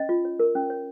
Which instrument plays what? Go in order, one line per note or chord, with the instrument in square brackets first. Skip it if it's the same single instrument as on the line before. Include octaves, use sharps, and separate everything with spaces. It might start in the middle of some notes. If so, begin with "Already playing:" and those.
Already playing: [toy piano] C#4 D#5
F4
C#5
A#4
C#4
C#5